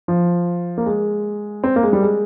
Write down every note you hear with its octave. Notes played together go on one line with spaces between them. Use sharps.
F3
A#3
G#3
C4
A#3
G#3
G3
G#3